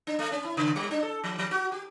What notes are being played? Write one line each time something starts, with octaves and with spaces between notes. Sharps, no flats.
D4
A3
C#4
E4
C#3
G3
D4
A4
F3
F3
F#4
G4